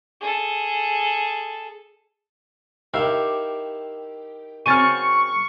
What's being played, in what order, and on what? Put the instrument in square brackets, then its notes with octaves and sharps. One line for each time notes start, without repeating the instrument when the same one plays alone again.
[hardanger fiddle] G#4 A4
[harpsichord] D#3 E4 F5 [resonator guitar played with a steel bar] G4
[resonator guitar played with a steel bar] C#3 F#3 C4 [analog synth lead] C#6 [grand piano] F6 A6 D#7